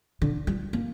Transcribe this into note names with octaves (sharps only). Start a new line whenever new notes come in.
D3
G3
A#3